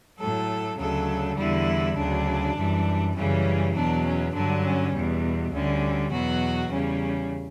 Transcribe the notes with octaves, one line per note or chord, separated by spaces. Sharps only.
A2 F#3 A4
D2 C#3 F#3 A4
E2 D3 G3 E4
D2 C#3 F#3 D4
F#2 E3 G3
F#2 C#3 E3 G3 C#4
E2 B2 F#3 D4
C#4
G2 D3 F#3 D4
C#4
E2 B2 G3
D2 D3 G3 C#4
E2 B2 F#3 F#4
E2 C#3 G3 C#4